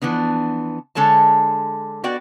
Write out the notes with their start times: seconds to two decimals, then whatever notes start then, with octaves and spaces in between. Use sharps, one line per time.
0.02 E3 F3 B3 D4
0.95 D3 G#3 A4 C#5 A5
2.04 B3 F#4 D5 G5